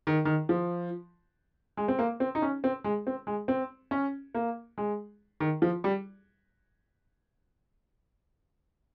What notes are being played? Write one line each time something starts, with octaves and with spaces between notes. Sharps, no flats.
D#3
D#3
F3
G#3
C4
A#3
C4
D#4
C#4
C4
G#3
C4
G#3
C4
C#4
A#3
G#3
D#3
F3
G3